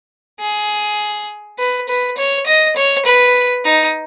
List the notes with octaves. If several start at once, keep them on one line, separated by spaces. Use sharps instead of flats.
G#4
B4
B4
C#5
D#5
C#5
B4
D#4